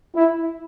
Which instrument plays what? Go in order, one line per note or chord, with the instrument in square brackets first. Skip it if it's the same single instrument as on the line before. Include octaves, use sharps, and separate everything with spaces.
[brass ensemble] E4